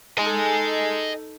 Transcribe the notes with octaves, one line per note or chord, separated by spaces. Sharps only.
D#4 A4 D#5 G#5